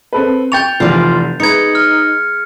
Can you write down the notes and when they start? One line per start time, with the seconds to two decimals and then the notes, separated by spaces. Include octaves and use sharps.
0.13 C4 A4 B4
0.52 G5 C#6 G6 A6 F7
0.80 F1 E3 F4 D5
1.40 G#3 D#4 B4 G#6 C#7
1.75 F6